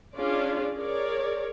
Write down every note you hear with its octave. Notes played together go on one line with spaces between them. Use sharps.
C#4 D4 F4 G#4 D5
G#4 A#4 C#5 D5